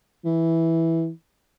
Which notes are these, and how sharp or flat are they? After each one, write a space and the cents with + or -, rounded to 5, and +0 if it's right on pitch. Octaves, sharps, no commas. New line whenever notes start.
E3 -5